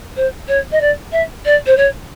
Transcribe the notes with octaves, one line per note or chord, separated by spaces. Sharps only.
C5
C#5
D#5
D5
E5
D5
C5
C#5